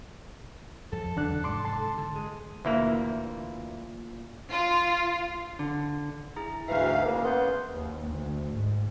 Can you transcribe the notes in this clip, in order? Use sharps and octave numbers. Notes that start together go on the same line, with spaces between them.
F2 A4
E2 D3 E3 F#3 D4 F#6
G#2 C3 C6 D6
A5 C6
D3
G#3
D2 A#2 E3 A#3 E4 E5
F4
D3
E4 G#4 A#5
D2 G#2 E3 F#4 B4 E5 F5
C#3 A#3
B3 C6 G6
D#2
D2
G#2